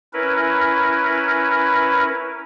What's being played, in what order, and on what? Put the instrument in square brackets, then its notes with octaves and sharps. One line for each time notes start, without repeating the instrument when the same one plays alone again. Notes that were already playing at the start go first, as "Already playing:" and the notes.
[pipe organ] C#4 E4 A#4 B4